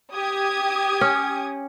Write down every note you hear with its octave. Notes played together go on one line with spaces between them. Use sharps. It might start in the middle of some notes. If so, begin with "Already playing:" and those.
G4 D#6 G#6
C#4